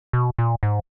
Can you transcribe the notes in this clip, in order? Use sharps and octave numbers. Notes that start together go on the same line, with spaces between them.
B2
A#2
G#2